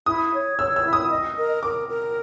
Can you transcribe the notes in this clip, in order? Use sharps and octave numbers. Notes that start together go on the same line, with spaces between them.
E4 D#6
C#5
C#5 E6
E6
E4
D#6
D#5
A#4
A#4 D6
A#4